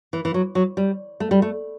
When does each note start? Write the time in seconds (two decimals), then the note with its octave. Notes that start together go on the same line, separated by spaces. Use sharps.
0.13 E3
0.25 E3
0.34 F#3
0.55 F#3
0.77 G3
1.20 A3
1.31 G3
1.42 A3